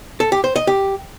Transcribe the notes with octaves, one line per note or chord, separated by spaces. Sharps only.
A4
G4
C5
D#5
G4